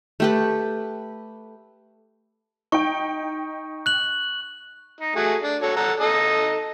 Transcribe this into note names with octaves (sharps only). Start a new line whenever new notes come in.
A3 G4 B4
D#4 G5 C#6
F#6 F#7
D#4
A3 F#4 G#4
D4
F#4 A4 C#5
A4 F#5 A#5
D#4 A4 D#5